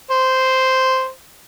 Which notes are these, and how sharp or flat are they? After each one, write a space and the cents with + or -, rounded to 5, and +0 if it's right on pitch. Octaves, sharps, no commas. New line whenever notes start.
C5 -5